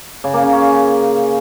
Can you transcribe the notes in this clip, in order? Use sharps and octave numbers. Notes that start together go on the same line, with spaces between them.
C#3
A#3
C#3
C#4